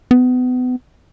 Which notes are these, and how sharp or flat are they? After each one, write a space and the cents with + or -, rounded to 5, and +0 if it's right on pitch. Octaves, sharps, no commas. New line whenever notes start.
B3 +30